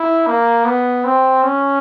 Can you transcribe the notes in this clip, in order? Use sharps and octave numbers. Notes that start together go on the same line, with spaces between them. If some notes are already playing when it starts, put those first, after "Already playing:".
Already playing: E4
A#3
B3
C4
C#4